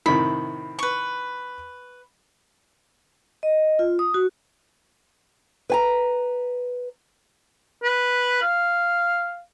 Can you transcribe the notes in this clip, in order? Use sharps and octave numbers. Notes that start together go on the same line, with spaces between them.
A2 C3 D#3 B5
B4 C#6
D#5
F4
D#6
F#4
B4 G#5 A#5
B4
F5